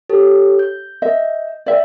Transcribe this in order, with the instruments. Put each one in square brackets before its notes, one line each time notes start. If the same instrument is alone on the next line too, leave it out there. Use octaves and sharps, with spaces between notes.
[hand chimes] G4 A4 C#5
G6
[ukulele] D#5 E5
D5 E5 G5